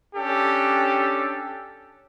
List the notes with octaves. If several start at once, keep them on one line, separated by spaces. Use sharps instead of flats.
C#4 D4 G4 A4